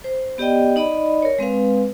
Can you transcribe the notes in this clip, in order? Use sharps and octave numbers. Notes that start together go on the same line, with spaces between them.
C5
B3 G4 D5 D#5 G5
D#4 D5 D#5 B5
A#4 C#5
G#3 C4 B4 F5